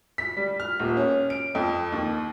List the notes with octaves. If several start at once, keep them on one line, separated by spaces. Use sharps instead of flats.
B6
G3
F6
D#1
C#4
D7
F2
D#2